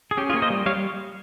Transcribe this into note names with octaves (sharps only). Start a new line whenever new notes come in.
G#4
C#4 G4
F4 G#4
A#3 C#5
C5 D#5
G3
G3 C#5 F5